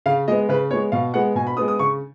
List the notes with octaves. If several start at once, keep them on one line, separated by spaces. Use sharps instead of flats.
C#3 F5
G#3 B3 D#5
C#3 B4
G#3 B3 C#5
B2 F5
G#3 B3 F#5
B2 G#5
B5
G#3 B3 D#6
D#6
C#3 C#6